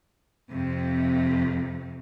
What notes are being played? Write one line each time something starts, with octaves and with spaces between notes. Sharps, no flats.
F2 C3